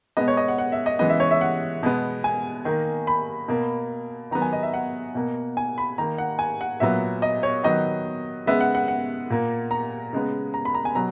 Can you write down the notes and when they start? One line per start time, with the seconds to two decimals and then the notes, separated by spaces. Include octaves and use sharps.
0.17 B2 G#3 B3 D#5
0.28 C#5
0.37 D#5
0.48 F#5
0.58 F#5
0.72 E5
0.86 D#5
0.99 C#3 E3 G#3 B3 D#5
1.10 E5
1.20 C#5
1.31 E5
1.41 F#5
1.83 B2 G#3 B3
2.24 G#5
2.65 D#3 A#3
3.07 B5
3.48 B2 A#3
4.31 D#3 F#3 B3 A#5
4.42 G#5
4.53 D#5
4.63 E5
4.74 F#5
5.15 B2 A#3
5.57 G#5
5.78 B5
5.98 D#3 A#3 A#5
6.18 F#5
6.39 G#5
6.61 F#5
6.80 A#2 F#3 B3 E5
7.22 D#5
7.43 C#5
7.63 D#3 F#3 B3 D#5
8.46 C#3 G#3 B3 E5
8.61 F#5
8.75 F#5
8.88 F#5
9.30 A#2 A#3
9.71 A#5
10.13 C#3 G#3 B3
10.54 A#5
10.65 B5
10.75 A#5
10.85 G#5
10.95 B2 F#3 A#5